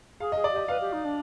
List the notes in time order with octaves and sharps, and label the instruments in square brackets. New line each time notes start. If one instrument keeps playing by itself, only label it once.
[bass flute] G#4 [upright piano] F5
[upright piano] D#5
[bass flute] G#4
[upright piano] D5
[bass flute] G4 [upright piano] D#5
[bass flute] B4 [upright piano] F5
[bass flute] G4
D#4
D4